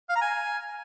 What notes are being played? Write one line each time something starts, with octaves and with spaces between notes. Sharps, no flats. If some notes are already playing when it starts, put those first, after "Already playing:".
F5
A#5
G#5